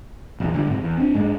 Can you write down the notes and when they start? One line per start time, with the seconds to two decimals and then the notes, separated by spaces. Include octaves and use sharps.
0.40 A#1 E2
0.54 D3 D#3 G3
0.67 F1 G#2 C3
0.82 E2
0.97 C4 D4
1.14 G#2 G#3 A#3 D4